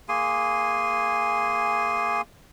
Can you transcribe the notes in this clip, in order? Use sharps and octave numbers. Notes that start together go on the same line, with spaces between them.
A#3 G#4 G#5 C6